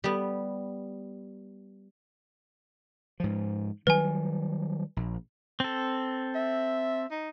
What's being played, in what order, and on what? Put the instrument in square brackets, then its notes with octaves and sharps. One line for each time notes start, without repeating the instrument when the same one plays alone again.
[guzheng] G3 B3
[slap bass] G#2 F3
[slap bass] D#3 F#3 G3 [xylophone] B4 G#5
[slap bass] A#1
[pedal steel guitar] C4 A4
[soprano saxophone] E5
D#4